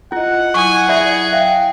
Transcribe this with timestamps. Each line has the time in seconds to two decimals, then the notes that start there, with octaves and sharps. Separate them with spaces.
0.12 E4 F4 D#5 F#5
0.54 F#3 E4 G#5 C#6 D#6
0.89 G#4 D5 E5 B5
1.33 E5 F5 G5